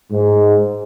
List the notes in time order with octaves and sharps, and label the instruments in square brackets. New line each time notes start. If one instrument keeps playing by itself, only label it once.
[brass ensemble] G#2